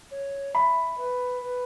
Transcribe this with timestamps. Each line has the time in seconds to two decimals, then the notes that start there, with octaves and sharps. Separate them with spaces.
0.11 C#5
0.54 E5 B5
0.98 B4
1.42 B4